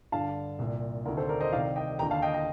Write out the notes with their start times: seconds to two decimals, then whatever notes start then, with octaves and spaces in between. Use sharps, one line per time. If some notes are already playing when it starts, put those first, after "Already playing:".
0.12 G2 D3 F5 A5
0.59 C2 A#2
1.05 D2 C3 D#3 A#4
1.17 A4 C5
1.29 A#4 D5
1.40 C5 D#5
1.52 C2 C3 D#3 D5 F5
1.76 D#5 G5
1.99 D#2 G5 A#5
2.03 D3
2.11 F5 A5
2.22 D#5 G5
2.34 D#5 G5